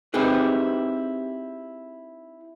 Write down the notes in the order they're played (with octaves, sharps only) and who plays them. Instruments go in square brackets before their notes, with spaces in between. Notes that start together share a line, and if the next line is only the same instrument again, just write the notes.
[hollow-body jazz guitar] C4 D#4 E4 G4 G#4 B4